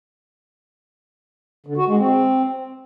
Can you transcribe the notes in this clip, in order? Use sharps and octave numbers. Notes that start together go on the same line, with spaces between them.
D3
F#4
G#3
C4